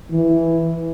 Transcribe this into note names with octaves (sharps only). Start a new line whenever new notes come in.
E3